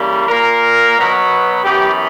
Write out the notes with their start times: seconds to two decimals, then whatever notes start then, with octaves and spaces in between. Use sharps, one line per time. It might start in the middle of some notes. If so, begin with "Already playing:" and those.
Already playing: C#3 E3 G3 A#3
0.27 A#2 A#3 A#4
0.96 B2 F#3 B3
1.64 F#2 E3 B3 G4